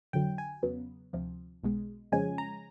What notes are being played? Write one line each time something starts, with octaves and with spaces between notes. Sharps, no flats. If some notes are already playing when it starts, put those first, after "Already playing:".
G1 F2 D3 F#3 G5
G#5
E2 C#3 F#3 B3
D2 C3 F3
B1 B2 G#3
F2 C#3 F3 G#3 C#4 G#5
A#5